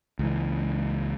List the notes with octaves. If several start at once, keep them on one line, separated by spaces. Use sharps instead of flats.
C#2 E3